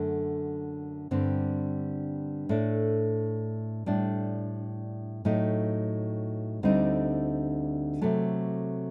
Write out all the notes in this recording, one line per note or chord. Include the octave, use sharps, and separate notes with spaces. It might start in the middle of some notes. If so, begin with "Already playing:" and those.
Already playing: F#2 D3 A3
G2 D3 G3 C4
A2 A3 D4
A2 G3 D4
A2 F#3 A3 D#4
D2 D3 G3 C4 D#4
C3 F#3 A3